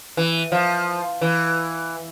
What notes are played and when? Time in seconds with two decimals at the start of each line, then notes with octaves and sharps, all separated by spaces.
0.17 E3
0.52 F3
1.21 E3